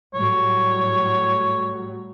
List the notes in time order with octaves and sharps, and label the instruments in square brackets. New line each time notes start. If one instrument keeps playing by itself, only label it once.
[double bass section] A2 F#3 G3 [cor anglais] C#5